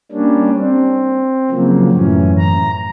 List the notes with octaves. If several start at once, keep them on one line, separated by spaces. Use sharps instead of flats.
G3 A#3 C#4 D4
C4
C#3 F3 F#3 A#3
F#2 A2 E3 C#4
A#5